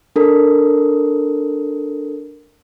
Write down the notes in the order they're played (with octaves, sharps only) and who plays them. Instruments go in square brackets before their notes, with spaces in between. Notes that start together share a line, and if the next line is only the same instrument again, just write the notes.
[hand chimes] D4 A4 A#4